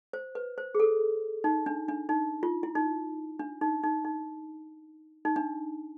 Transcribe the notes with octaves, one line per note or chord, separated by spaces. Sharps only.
C5
B4
C5
G#4
A4
D#4
D4
D4
D#4
F4
E4
D#4
D4
D#4
D#4
D#4
D#4
D4